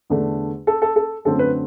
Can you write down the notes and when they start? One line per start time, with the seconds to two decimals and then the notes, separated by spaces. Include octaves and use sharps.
0.10 E2 D3 A3 D4
0.67 A4
0.82 A4
0.96 A4
1.25 F#2 D3 A3 C4 A4
1.39 B4